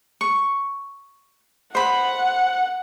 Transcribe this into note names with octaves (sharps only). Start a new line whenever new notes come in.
C#6
C5 F#5 B5